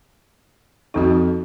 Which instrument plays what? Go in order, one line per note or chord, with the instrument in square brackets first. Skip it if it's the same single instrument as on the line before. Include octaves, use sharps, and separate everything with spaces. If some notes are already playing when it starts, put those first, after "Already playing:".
[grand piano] F2 A4 D#5 [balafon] D#4 F#4